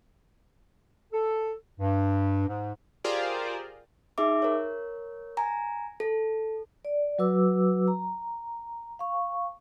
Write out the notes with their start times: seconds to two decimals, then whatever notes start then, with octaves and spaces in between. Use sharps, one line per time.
1.12 A4
1.78 G2
2.47 G#2
3.04 F4 G4 G#4 A#4 C5 D5
4.18 D#4 G#4 E5 D6
4.42 A#4 C#5
5.37 G#5 A#5
6.00 A4
6.85 D5
7.18 F#3 F#4 B4 D6 E6
7.88 A#5
8.99 F5 C#6